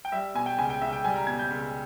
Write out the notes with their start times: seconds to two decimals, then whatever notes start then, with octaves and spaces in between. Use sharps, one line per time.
0.05 G5
0.12 G3 E5
0.34 B2 G#5
0.46 G5
0.58 C#2 G#5
0.70 G5
0.81 C#2 E5
0.93 G5
1.04 G3 G#5
1.16 A#5
1.27 B2 G#6
1.39 G6
1.50 C#2